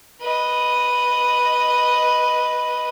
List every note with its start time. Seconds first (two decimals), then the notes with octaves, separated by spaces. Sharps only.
0.21 B4 D#5